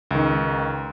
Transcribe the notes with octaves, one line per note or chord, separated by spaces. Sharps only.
C#2 D#3